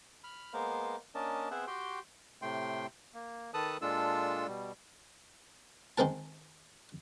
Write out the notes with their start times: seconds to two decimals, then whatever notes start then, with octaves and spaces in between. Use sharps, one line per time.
0.24 B5 F6
0.53 G#3 A#3 B3 A#4 C5 F5
1.15 A#3 C#4 D4 A#4 D#5 A5
1.51 B3 C4 G#4 C5 E5 F#5
1.67 F#4 G4 G5 C6
2.42 A2 C3 A3 G5 C6
3.14 A#3
3.54 D#3 A4 B4 A5 D#6 F#6
3.82 A#2 G#3 D4 F4 A4 E6
4.47 B2 G3
5.98 D#3 G#3 C4 A#4 A5